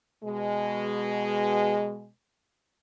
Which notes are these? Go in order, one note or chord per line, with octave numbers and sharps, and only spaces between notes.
B2 G#3